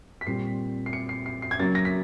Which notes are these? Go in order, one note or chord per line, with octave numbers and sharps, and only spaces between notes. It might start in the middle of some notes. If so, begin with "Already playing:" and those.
B6
A#2 G3 C4 C7
C7
C#7
C7
C7
C7
G#6
C#3 F#3 A#3 A6
A#6
B6